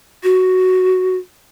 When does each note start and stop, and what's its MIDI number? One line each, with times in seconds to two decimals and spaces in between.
0.23 1.15 66